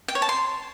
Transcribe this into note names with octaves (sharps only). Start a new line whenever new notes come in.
G5
C#5
A5
C6